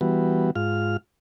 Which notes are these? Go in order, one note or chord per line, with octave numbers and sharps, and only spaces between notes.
E3 G3 B3 F#4
G#2 F4 F6